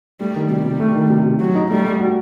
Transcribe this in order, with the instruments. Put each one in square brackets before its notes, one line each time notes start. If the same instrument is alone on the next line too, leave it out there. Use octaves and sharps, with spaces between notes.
[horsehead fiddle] G3 [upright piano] A3
[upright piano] D#3
[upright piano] C3 [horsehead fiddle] G3
[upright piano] C3
A3
D#3
C3
C3
[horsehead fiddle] F#3 [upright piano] F#4
[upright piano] D#4
[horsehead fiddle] G3 [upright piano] A3
[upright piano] A3
F#4